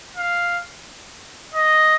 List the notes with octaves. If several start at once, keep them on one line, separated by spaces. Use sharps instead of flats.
F5
D#5